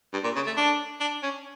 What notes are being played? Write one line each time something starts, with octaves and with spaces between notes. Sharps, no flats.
G2
A#2
C#3
A3
D4
D4
C#4